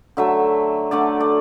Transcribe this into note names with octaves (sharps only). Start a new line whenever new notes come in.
D3 F#3 A3 E5
D3 A3 D5
D5